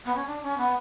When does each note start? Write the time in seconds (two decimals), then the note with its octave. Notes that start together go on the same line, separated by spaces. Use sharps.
0.05 B3
0.16 C#4
0.27 D4
0.43 C#4
0.58 B3